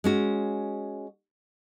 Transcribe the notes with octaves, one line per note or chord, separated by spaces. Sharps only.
G#3 C#4 F#4